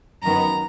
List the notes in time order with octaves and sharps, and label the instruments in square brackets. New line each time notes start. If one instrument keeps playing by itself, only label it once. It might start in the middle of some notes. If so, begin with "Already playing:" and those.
[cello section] F#2 D#3 F#3 B3 [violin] A#5